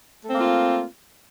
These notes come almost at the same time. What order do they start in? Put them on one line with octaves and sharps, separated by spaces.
A3 C4 A#3 F4